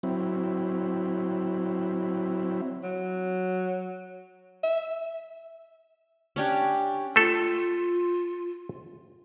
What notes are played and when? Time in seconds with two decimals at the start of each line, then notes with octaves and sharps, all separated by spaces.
0.03 F#3 C4 E4
2.83 F#3
4.63 E5
6.36 C#4 D4 G4
7.16 A3 F4 A4